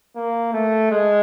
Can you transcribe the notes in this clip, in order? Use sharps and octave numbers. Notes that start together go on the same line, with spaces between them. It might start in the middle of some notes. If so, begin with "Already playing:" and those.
A#3
A3
G#3